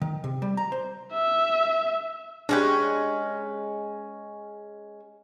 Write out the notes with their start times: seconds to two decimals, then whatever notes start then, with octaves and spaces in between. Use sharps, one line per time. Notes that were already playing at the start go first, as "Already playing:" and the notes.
0.02 D#3
0.24 C3
0.42 G3
0.57 A#5
0.72 C5
1.13 E5
2.49 G#3 C#4 D4 G4 B4